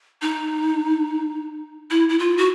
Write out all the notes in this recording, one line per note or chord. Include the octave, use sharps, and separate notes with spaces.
D#4
E4
E4
F4
F#4